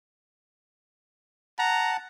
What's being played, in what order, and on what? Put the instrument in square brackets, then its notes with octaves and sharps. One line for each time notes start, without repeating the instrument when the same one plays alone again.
[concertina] F#5 A5 [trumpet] A#5